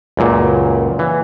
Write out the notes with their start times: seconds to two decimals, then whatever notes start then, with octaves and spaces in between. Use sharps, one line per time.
0.17 C#2 F#2 A#2
0.99 E3